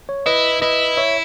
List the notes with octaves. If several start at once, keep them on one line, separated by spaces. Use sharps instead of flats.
C#5
E4 B4 D#5
E4 B4 D#5
C#5 E5